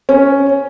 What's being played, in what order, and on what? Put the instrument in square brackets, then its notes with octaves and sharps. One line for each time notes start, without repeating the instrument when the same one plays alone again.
[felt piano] C#4